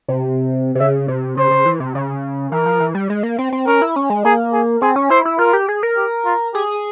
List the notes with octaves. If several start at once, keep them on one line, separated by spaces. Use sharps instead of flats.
C3
C3
C#3 E5
C3
C#3 C5
C#3
E3
C3
C#3
E3 A#4
F3
E3
G3
G#3
A#3
C4
C4
C#4 A#4
E4
C#4
G#3
A#3 G#4
G#4
C4 G#4
C#4
E4 C5
E4
F4 A#4
G4
G#4
A#4
G4
F4
G4 G#4